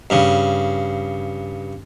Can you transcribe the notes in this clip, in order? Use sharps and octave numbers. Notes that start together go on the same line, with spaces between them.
G2 C#3